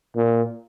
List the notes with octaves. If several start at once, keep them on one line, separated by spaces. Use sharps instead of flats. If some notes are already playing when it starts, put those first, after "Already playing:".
A#2